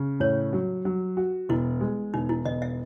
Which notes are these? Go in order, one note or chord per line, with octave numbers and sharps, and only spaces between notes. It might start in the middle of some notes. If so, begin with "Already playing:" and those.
Already playing: C#3
A2 C#5
F#3
F#3
F#4
E1 E4
G#3
E1 D#4
E4
E1 D#5
E5